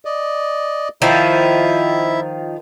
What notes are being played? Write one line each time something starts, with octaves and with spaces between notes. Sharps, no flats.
D5 D#5
D#3 F3 D#4 E4 E5